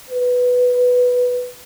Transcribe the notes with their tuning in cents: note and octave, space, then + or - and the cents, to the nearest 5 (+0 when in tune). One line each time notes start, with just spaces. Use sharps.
B4 +0